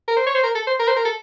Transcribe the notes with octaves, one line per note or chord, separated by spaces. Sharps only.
A#4
C5
C#5
C5
A#4
A4
C5
A#4
C5
A#4
A4